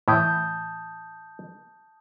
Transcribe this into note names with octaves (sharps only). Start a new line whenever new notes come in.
A2 E3 E4 A5 D#6 G6